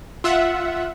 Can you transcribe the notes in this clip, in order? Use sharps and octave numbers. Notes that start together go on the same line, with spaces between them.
F4 E5 F#5